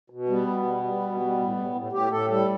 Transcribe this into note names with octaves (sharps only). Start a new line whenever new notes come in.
B2
G3 B3
B2
G3
G3
B2
G3
A2
A2
A2
A2 G4
A2 A4
G3 A4